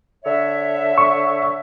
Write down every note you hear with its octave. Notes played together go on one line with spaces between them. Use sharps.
D3 C#5 E5
C#6